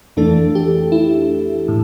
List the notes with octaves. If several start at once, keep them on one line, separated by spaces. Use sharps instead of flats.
F2 E3 A3 D4 A4
G4
E4
A2